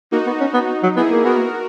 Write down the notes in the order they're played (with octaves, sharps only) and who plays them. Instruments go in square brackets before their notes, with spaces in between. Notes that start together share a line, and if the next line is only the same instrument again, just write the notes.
[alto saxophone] A#3 [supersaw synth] D#4 F#4
[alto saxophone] B3
C#4
B3
[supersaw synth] D#4
[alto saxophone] F#3
[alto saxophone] B3 [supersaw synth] E4 G#4
[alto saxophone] A#3
[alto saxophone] B3 [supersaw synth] F#4 A#4
[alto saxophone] A#3